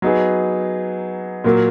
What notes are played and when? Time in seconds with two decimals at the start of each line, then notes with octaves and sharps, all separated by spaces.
0.02 F#3 B3 D#4 G#4 B4
1.44 A#2 F#3 A#3